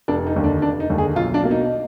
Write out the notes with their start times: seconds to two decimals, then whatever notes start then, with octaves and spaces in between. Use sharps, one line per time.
0.08 F1 D4
0.27 D#4
0.36 D#2 D3
0.44 D4
0.62 F1 D4
0.80 D#4
0.90 D#2 D3
0.98 G#4
1.16 B1 F4
1.34 D4
1.43 B2 A#3
1.51 D#4